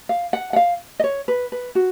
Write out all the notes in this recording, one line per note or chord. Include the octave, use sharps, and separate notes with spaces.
F5
F#5
F#5
F5
D#5
C#5
B4
B4
F#4